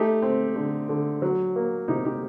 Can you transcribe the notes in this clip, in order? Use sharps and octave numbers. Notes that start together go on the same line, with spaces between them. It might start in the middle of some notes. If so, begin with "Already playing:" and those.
Already playing: A3 D#4 G4
C4
D3
D3
F#3
A#3
C3 D#4 G4
D#4 G4